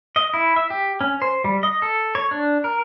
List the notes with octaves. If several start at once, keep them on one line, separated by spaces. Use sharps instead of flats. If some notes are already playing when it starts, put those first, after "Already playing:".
D#5
E4
E5
G4
C#4
C5
G3
D#5
A4
C#5
D4
A#4